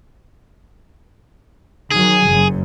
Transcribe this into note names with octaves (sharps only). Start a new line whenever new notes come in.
D#3 F#3 G#4
F#1 F#2